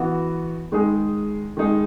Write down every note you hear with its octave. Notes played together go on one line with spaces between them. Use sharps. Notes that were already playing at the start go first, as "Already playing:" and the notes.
Already playing: E3 B3 F#4
D#3 G#3 D#4 G#4
D#3 G#3 D#4 G#4